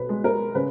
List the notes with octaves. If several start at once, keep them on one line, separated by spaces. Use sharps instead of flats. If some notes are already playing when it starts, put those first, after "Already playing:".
Already playing: B1 B4
G#3
A#4
C#3 B4